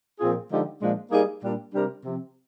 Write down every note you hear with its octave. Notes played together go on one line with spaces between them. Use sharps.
A#2 F3 C4 F4 G#4
D3 F3 G#3 D#4 G4
A#2 F3 G#3 D4
G3 A#3 D#4 G#4
A#2 G3 D4
C3 G3 D4 G4 A#4
C3 F3 C4